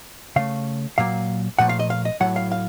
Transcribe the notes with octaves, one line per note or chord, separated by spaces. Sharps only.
C#3 A3 F5
A#2 F#3 A#3 F5
A#2 F3 A3 F#5
F5
D#5
F5
D#5
A2 F#3 A3 F#5
F5
F5